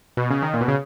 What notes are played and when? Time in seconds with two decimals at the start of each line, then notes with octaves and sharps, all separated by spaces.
0.17 B2
0.31 C#3
0.42 D#3
0.54 A#2
0.61 B2
0.68 C#3